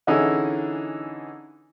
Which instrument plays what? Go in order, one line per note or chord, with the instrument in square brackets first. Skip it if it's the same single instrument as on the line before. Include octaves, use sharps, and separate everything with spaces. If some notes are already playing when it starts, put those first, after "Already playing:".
[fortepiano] D3 E3 C#4 D#4 E4 G#4